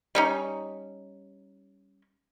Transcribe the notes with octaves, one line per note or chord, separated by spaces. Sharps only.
G3 C#4 D#4